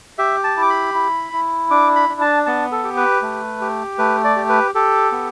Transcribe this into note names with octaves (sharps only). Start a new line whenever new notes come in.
G4 E5
A5
E4 D6
B5
E4
E4
D4 D6
B5
D4
A5
B3 A5
A4
G4
B4
A3
G4
A3 B4
D5
G4
B4
G4 A4
B3